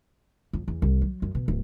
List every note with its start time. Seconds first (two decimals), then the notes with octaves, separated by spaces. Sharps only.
0.53 F2
0.68 E2
0.82 C2
1.01 F#3
1.22 F#2
1.35 B2
1.48 D1